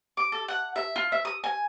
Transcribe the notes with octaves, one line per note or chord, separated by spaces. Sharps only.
D6
A4
F#5
E5
F4
E5
D#6
G#5